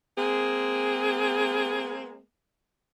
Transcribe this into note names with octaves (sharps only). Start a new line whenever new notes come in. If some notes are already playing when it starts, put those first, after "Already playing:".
G#3 A#3 C4 G#4